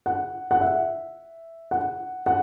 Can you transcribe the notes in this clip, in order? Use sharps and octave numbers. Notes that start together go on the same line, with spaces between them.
F#5
F#5
E5
F#5
F#5